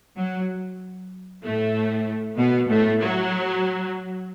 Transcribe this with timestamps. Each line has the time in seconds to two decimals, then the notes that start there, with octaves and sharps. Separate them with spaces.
0.19 F#3
1.44 A2 A3
2.37 B2 B3
2.69 A2 A3
3.00 F#3